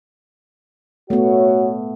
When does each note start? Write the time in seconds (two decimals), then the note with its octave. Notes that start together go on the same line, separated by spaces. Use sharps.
1.10 A3 B3 F#4 C#5